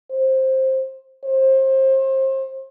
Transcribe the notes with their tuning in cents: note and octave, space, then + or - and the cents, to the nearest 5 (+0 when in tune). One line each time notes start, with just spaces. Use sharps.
C5 +10
C5 +30